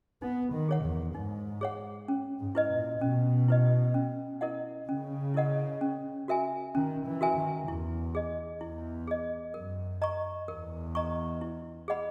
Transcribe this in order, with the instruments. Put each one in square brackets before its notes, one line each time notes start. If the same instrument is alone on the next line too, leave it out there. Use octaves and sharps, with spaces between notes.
[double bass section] B3 [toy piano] D#4
[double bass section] D#3
[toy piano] G#4 C#5 F#5
[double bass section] E2
[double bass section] G#2 [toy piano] D#4
[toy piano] G#4 C#5 F#5
C#4
[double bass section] G#2
[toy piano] E4 B4 D#5
[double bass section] A#2
[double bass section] B2 [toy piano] C#4
[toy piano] E4 B4 D#5
C#4
E4 A#4 D#5 F#5
[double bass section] C#3 [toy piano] C#4
[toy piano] E4 A#4 D#5 F#5
C#4
F#4 A#4 E5 G#5
[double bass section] D#3 [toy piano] C#4
[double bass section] E3
[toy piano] F#4 A#4 E5 G#5
[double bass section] D#3
[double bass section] E2 [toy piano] E4
[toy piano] G#4 D#5
[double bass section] E2 [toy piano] E4
[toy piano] G#4 D#5
[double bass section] F#2 [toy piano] A#4
[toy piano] D#5 A#5 C#6
[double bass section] E2 [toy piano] A#4
[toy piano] D#5 A#5 C#6
E4
G#4 D#5 F#5 B5